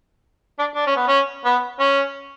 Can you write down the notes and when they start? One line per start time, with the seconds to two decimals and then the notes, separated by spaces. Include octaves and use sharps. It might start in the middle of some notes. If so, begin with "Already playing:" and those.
0.59 D4
0.75 D4
0.87 C#4
0.97 B3
1.08 C#4
1.45 B3
1.80 C#4